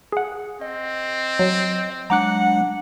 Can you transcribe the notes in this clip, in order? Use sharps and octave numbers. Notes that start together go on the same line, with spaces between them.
G#4 F#5
C4 D#5
F#3
F#3 G#3 D4 F#5 A#5 D6 F#6